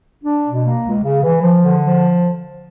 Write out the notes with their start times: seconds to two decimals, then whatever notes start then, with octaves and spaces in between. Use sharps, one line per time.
0.24 D4
0.45 B2
0.64 A#3
0.83 C#2
1.02 C#3
1.22 E3
1.42 F3
1.61 D3
1.81 F3